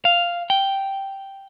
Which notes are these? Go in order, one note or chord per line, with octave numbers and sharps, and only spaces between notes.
F5
G5